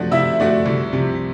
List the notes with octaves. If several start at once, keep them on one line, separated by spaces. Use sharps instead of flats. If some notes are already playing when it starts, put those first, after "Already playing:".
Already playing: C3 F3 A3 D4 F#4
C3 E4 E5
F3 A3 D4 F#4
C2
C3 F3